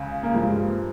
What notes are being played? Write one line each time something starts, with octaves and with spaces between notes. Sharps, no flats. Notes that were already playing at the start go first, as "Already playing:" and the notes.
Already playing: C#2 C#3
A#3
G2 F3 G#3